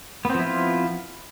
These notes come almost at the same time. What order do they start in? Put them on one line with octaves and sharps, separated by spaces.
B3 C4 F3 E4 F4